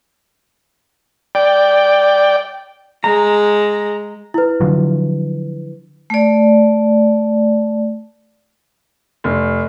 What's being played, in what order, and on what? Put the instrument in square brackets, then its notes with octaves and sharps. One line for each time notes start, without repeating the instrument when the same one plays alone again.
[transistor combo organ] D5 G5
[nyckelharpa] G#3 [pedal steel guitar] A#5
[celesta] E4 B4
[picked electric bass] D3 F3 F#3
[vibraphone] A3 D5
[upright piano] F1